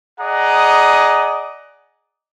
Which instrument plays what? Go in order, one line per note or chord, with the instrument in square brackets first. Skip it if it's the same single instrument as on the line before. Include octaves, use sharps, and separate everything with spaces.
[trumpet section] G#4 D5 D#5 F#5 A#5 D#6